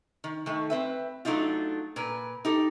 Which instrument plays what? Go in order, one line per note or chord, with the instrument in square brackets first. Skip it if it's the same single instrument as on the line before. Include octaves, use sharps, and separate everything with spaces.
[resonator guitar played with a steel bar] D#3
D#3 A3
C4 B4 E5
F#3 A3 D4 D#4 F4
A#2 A#4 B4
D#4 G4 A4